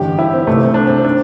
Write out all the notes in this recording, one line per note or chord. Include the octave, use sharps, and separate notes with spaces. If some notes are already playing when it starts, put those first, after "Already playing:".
Already playing: A1 G2 D3 G4
E4
C4
C2 C3 E3 A3
C4
D4
C4
D4